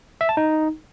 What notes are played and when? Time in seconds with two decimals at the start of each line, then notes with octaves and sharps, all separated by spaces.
0.21 E5
0.29 A5
0.37 D#4